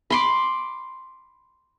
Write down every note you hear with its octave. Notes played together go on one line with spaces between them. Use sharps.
B5 C6 D6